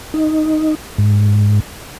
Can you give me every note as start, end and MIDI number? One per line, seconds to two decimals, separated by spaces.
0.14 0.75 63
0.98 1.60 44